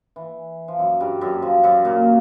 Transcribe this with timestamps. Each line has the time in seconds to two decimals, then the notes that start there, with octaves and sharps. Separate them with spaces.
0.16 E3
0.68 F3
0.79 F#2 F#3
1.00 G2 G3
1.21 F#2 F#3
1.42 F3
1.63 F#2 F#3
1.85 A#2 A#3